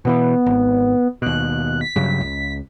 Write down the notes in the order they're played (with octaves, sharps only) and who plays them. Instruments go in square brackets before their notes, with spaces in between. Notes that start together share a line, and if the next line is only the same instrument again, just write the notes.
[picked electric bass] B2 D3 E3 [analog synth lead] B3
[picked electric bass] G#1
[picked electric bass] D#2 B2 [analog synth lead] F#6
[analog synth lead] B6
[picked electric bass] G2 C#3 F#3
C#2